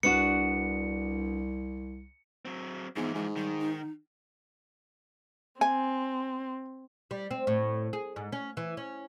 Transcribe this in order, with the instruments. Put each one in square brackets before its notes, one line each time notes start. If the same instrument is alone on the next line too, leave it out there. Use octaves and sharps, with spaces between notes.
[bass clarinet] C2 [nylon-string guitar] B3 D4 F#4 [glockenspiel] C#7
[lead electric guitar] F#3 C4
[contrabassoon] G#2 [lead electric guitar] E3 F3 [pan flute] B3
[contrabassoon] G#2 [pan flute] G#3
[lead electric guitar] D#3 [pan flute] G3
[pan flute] D#4
[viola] C4 [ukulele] G#5
[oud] G3
C4
A2
G#4
G#2
C#4
E3
C#4